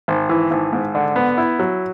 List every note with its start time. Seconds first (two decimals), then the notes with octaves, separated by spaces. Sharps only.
0.08 G#1
0.29 E3
0.51 G#1
0.73 G#2
0.95 D3
1.16 B3
1.38 E4
1.59 F#3